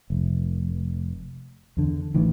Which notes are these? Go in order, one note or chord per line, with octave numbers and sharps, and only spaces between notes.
F1
E2 D3
A1 D#3 E3